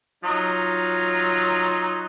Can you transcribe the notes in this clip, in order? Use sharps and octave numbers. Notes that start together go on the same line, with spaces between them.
F#3 D#4 F4